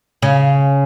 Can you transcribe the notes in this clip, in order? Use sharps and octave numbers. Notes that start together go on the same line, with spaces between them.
C#3